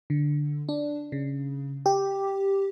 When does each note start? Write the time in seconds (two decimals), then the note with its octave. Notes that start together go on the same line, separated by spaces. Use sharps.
0.10 D3
0.69 D4
1.12 C#3
1.86 G4